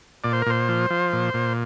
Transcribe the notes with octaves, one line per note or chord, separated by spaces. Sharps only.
A#2 D5
C5
A#4
A#2 C5
F3
F3
A#2
A#2